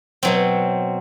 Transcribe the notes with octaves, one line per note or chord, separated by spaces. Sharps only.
B2 F#3 C4